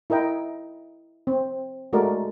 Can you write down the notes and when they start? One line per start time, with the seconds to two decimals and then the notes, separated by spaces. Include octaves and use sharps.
0.10 E4 A#4 D#5 G5
1.27 C4
1.93 G#3 A3 F#4 A#4 D5